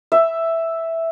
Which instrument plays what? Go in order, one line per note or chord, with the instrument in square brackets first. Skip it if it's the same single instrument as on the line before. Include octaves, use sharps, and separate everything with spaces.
[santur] E5